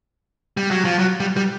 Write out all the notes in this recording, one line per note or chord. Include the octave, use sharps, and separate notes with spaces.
G3
F#3
F3
F#3
G3
G3